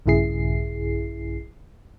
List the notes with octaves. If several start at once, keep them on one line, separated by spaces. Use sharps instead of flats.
A#1 G2 C#3 E4 G#4 C7